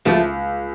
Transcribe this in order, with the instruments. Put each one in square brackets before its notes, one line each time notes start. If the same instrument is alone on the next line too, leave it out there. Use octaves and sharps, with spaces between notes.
[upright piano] C#2 [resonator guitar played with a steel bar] F3 A3